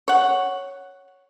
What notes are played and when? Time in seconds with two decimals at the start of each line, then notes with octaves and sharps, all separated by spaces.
0.08 C#5 F#5